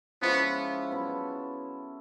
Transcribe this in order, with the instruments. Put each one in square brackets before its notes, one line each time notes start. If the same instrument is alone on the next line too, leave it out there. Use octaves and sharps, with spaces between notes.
[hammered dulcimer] F3 G#3 C#4 E4 [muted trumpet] B3
[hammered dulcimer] F#3 B3 E4 A4